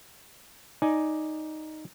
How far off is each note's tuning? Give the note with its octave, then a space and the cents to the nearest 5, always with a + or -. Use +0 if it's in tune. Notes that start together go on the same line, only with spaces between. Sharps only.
D#4 +0 D5 +0 G#5 +10